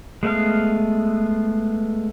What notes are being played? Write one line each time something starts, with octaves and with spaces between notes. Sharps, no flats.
G#3 A3 B3 F5